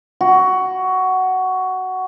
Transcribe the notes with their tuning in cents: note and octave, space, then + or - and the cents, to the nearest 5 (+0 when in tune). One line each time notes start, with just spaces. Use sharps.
F#4 +10